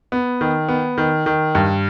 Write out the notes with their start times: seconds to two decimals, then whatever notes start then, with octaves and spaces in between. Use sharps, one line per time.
0.12 B3
0.41 D#3
0.69 B3
0.98 D#3
1.26 D#3
1.55 G2